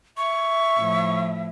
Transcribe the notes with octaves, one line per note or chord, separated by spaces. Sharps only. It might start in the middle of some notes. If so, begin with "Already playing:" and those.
E5 C#6
A2 F3